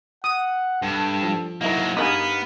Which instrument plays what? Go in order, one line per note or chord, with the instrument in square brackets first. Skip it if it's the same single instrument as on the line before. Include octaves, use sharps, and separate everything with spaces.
[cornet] F#5 [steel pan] D#6
[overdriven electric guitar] G2 [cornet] A4 [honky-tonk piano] E7
[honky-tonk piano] F3
[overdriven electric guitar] F#3 A#3 [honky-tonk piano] D#4 E4 A#4
[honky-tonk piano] G2 D6 [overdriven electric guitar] B3 [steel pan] D#4 A#4 G#5 [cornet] F5